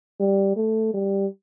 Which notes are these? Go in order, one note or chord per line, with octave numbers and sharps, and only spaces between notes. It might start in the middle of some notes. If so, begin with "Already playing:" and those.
G3
A3
G3